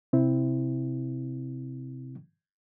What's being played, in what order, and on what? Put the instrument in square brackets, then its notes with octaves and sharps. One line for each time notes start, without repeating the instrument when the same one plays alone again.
[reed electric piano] C3 C4 E4